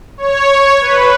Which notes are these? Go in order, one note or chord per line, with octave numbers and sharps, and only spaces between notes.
C#5
B4